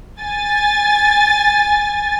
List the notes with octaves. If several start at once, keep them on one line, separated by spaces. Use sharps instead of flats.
G#5 A6